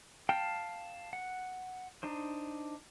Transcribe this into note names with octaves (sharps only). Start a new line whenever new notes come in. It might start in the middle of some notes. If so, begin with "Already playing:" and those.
F5 G5 A5 F6
F#5
D4 D#4 C5